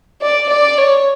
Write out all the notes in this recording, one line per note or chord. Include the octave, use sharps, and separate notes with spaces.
D5
D5
C#5